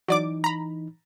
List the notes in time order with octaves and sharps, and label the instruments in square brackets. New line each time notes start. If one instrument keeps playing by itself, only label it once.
[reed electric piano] E3 D#4 [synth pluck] F#3 D5 D6
[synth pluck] A#5 B5